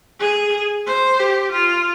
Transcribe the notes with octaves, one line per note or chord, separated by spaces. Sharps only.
G#4
C5
G4
F4